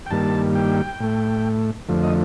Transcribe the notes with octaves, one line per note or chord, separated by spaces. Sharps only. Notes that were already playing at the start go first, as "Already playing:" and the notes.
G5
G2 D#3 G3 A#3 A5
G5
A2 A3
F2 D3 F3 A3
D#5